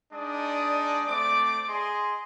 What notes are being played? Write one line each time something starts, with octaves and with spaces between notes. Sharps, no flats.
G#3 D4 D#4 D5 D#6
A3 C4 D5 D6
G#4 D#5 C6